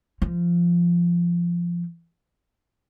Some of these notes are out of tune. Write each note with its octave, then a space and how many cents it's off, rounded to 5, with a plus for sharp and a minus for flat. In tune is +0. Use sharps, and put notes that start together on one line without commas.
F3 -15